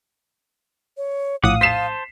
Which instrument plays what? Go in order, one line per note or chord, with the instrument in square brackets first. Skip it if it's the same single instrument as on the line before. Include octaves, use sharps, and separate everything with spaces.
[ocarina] C#5
[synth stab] A#1 A2 D#6 [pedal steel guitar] F3 F#5 D6 [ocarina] F5
[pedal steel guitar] C5 A5 [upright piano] B6 C7 E7